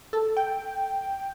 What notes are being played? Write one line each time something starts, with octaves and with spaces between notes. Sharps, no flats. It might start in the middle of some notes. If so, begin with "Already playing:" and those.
A4
G5